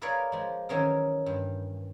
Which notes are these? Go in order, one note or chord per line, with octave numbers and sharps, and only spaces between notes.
G#4 A#4 B4 C#5 D5 F5
F3 G#3
D#3 E3 F#3 C#4 G#4 A#4
G2